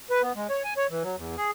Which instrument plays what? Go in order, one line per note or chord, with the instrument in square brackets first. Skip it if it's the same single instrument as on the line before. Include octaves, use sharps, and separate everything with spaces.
[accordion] B4
B3
G#3
C#5
G#5
C#5
E3
F#3
E2
G#4